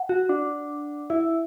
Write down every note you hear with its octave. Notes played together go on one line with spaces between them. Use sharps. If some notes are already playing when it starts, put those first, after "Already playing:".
Already playing: F#5
F#4
D4
E4 E5